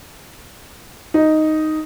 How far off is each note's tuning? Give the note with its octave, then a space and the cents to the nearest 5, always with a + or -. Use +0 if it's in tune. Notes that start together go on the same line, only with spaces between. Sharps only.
D#4 +0